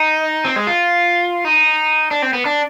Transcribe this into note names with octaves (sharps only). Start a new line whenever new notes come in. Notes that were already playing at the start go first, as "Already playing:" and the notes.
Already playing: D#4
C4
G#3
F4
D#4
D4
C4
B3
D4